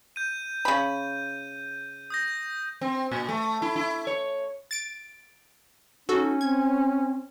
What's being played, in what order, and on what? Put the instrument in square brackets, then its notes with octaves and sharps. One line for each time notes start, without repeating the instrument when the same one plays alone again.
[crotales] G6 D#7
[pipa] C#3 B5
[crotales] D#6 G6 A#6
[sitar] C4
A#2
A3
E4
E4
C#5
[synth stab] A6 D7
[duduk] C#4 [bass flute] D#4 [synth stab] F#4 A4
[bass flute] C4 [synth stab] G#6